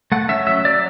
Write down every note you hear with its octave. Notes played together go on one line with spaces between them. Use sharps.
A3 F#5
C#4 E5
F#3 E5
F#3 D5